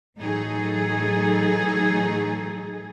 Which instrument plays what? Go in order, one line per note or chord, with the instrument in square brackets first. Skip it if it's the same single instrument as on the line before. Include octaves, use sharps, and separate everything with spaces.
[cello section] A2 E3 F#3 D#4 G#4 A4